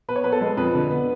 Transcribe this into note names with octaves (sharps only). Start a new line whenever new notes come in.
B3 B4
C#5
B3 B4
A4
G#3
F2 B4
D3
B3